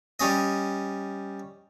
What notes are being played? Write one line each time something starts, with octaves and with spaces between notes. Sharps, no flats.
G3 C#4 D#5